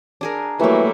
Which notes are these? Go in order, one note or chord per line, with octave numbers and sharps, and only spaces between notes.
D4 G#4 A#4
E3 F#3 G3 A3 A#3